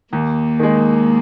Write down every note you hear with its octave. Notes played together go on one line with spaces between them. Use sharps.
D#2 A#3
D#3 G#3